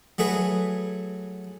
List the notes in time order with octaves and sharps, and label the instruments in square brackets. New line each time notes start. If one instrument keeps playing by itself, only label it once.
[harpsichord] F#3 A3 G#4 B4